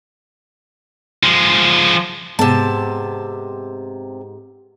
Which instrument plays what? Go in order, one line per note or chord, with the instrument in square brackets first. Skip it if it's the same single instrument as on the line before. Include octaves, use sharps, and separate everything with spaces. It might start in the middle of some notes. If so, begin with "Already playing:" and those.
[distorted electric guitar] F3 G#3
[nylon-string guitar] G#2 B3 G#4 [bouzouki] C3 A5